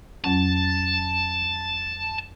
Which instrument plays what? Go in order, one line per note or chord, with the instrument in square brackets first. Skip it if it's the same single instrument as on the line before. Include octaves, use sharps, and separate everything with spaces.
[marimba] F2 F#3 C#4 [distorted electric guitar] A5